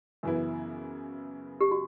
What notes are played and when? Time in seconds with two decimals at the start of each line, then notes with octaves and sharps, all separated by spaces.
0.23 F#2 C#3 E3 B3 E4
1.61 G4
1.72 F#4